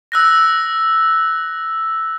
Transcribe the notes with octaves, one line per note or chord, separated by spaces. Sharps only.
E6 F#6 A#6